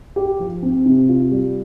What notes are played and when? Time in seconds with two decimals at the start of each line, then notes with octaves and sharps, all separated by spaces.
0.16 G4
0.40 F3
0.63 C4
0.85 C3
1.09 F4
1.31 G3